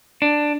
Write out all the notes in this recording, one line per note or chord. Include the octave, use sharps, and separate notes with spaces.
D4